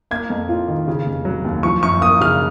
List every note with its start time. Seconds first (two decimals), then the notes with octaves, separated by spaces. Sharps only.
0.11 A#3 G#6
0.30 F2
0.49 F4
0.68 D#3
0.88 C#3
1.06 F1
1.25 F#3
1.45 D#2
1.63 F3 C#6
1.83 F#2 C#6
2.01 A#3 D#6
2.21 C#3 F6